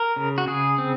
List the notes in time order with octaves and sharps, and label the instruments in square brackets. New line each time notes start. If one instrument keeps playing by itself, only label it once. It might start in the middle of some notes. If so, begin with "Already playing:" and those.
Already playing: [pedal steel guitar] A#4
C#3
F#4
C#3 G#4
C4